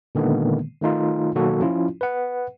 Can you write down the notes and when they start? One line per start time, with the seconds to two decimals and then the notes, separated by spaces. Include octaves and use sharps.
0.15 A#2 D3 D#3 G#3 A#3 B3
0.81 D#3 A3 D#4 F4
1.35 B2 D#3 F#3 A#3 F#4 A4
1.61 F3 C#4 E4 F4
2.01 B4 F#5